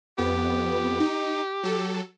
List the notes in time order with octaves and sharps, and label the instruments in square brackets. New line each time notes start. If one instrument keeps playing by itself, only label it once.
[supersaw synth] F2 B3 [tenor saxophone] G4
[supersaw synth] D#4
F#3 A4